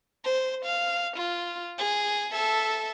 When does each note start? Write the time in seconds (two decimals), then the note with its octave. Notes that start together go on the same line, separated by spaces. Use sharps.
0.24 C5
0.65 F5
1.16 F4
1.78 G#4
2.33 A4 E5